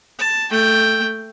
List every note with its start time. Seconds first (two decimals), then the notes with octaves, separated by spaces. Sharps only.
0.19 A5
0.51 A3 G5